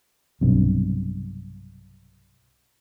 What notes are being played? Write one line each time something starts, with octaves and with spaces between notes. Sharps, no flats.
B1 G2 C3